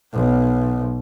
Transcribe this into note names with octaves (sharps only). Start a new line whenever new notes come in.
B1